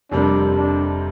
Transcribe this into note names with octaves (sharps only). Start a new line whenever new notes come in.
F1 F2 C3 G3 A#3 D4
D4